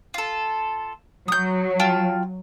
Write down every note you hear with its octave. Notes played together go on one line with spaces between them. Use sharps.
F4 A4
F#3 D#6 G6
F4 G5 A5